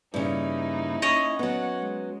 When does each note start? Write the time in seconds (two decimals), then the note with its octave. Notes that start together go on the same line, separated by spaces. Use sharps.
0.14 G2 C#3 A#3 D#4 E4
1.02 C#4 C#5 D#5
1.39 F#3 B3 F#5
1.79 G#3